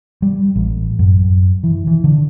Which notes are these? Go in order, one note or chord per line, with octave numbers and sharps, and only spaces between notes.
G3
A1
F#2
E3
E3
D3